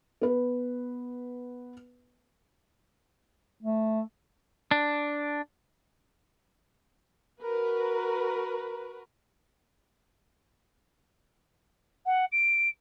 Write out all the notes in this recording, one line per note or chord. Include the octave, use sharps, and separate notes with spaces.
B3 B4
A3
D4
F#4 A#4 B4
F#5
D7